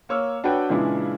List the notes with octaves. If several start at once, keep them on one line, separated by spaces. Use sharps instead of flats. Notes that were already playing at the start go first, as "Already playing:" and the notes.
A#3 C#5 E6 F6
D4 F#4 B4 C#5 G5
A#2 C#3 E3 G#3 D4 E4